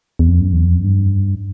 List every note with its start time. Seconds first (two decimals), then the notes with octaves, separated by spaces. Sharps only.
0.19 E2
0.28 F2
0.40 F#2
0.53 E2
0.65 F2
0.80 F#2
0.84 G2